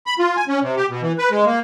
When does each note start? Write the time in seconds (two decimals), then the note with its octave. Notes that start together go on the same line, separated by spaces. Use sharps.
0.07 B5
0.19 F4
0.36 G#5
0.48 C#4
0.62 C3
0.77 G4
0.90 B2
1.01 E3
1.18 B4
1.30 G#3
1.46 A#3